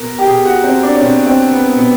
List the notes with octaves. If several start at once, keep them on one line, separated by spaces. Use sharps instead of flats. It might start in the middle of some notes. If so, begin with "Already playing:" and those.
Already playing: B2 A#4
G4
B2 G#4
F#4
C4
D4
C#4
B2 C4
C4
B3
B2 B3